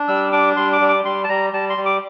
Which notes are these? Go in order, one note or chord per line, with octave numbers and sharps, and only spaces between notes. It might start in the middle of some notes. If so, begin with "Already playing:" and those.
Already playing: D4
G3 E6
D4 D6
G3 C6
D6
G3
D6
G3 C6
A5
G3 A#5
G3 A5
C6
G3
D6